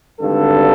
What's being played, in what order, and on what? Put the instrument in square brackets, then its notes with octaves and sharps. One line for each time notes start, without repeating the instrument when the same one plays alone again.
[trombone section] G#1 G2 D3 A4